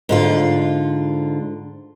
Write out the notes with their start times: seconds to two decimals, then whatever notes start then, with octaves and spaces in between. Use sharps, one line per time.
0.09 G#2 D3 F4